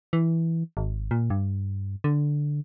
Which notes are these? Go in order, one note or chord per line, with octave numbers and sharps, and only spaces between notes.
E3
G#1
A#2
G2
D3